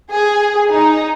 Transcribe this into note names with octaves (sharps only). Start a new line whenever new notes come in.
G#4
D#4